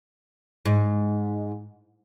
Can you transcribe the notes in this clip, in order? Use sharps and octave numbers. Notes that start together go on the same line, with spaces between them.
G#2